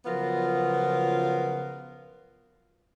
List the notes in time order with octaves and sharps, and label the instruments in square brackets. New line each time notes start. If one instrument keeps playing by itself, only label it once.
[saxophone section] C#3 F3 F#3 B3 F4 A#4